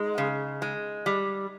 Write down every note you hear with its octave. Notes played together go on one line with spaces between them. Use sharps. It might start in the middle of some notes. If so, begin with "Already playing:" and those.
Already playing: G#3 D#4
C#3
G#3
G3